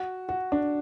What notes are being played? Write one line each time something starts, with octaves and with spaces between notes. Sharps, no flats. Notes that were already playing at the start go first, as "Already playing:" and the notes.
Already playing: F#4
F#4
D4